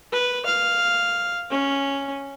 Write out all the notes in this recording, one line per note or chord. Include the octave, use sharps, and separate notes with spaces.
B4
F5
C#4